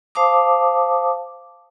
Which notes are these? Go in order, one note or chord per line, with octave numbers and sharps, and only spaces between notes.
C5 F5 A5 D6 D#6